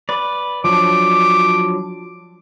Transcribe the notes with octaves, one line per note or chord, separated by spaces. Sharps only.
B4 D5
F3 F#3 D4 D6